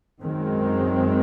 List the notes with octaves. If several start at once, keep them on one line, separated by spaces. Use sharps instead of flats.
F#2 D#3 G#3 C4